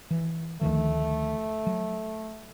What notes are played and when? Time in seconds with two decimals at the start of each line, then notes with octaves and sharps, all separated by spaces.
0.11 E3
0.61 D2 D#3 F3 A3
1.67 F#3